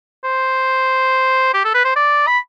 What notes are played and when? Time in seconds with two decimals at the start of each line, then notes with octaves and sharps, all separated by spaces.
0.24 C5
1.54 G4
1.65 A4
1.74 B4
1.85 C5
1.96 D5
2.27 B5